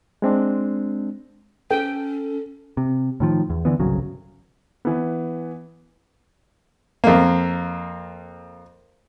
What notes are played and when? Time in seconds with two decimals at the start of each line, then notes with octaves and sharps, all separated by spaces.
0.22 G#3 C4 D4
1.71 C#4 A4 G5
2.77 C3
3.20 A2 D#3 F3
3.50 E2
3.65 D3 E3 B3
3.80 G1 C2 C#3 F#3
4.85 E3 B3
7.04 F2 A#3